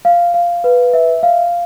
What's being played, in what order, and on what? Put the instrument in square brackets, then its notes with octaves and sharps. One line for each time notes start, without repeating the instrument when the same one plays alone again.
[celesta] F5
F5
B4
E5
F5